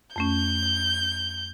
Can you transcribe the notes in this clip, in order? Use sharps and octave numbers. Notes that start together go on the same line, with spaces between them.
F2 A3 C#4 G6